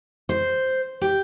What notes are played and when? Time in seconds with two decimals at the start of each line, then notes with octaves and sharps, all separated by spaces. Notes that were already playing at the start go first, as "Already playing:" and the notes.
0.29 C5
1.01 G4